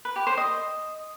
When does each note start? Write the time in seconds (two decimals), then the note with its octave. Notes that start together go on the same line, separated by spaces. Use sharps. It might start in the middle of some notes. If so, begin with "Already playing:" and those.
0.05 B4
0.16 G4
0.27 C5
0.37 D#5